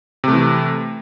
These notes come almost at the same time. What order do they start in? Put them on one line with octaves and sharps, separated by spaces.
C3 A3 E3